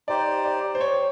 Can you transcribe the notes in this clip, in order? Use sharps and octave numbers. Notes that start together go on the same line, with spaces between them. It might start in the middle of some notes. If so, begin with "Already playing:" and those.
D#4 G4 C5 D5
D5
C5
C#5